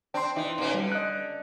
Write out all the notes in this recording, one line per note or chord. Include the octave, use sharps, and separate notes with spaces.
C4 D4 G5 C6
E3 D#4 D5
B2 A#3 C#4
D3 G3
D#5 F#6